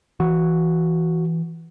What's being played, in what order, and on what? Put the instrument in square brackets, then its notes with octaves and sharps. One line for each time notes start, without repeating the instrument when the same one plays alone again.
[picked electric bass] E3 [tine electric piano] F#4